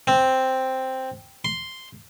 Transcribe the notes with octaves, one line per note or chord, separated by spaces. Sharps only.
C4
C6